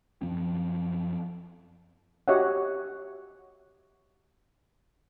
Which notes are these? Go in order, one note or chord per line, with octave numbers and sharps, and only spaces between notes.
F#2 F3 C4
F#4 G4 C#5 D#5 E5 F#5